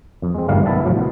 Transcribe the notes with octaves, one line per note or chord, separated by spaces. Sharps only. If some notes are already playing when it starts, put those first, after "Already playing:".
F2
G#3 C4
G1 G2 D#3 G3 A3 F5
B1 B3 E4 E5 A5
C#2 A2 F3 F#3
B2